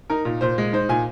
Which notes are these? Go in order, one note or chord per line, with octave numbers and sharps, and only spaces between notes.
D#4 A#4
A#2
A#2 C5
G#3
D#4 C5
A#2 G#5